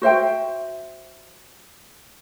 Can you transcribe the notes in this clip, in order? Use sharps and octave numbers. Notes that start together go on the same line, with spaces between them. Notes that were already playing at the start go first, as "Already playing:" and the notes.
F#4 C5 E5 G5